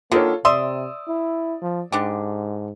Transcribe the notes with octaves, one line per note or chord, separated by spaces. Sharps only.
D3 D#3 A#3 F4 A4 C#5
C3 D5 E5 C6 D#6 E6
E4
F3
G#2 D3 D4 G4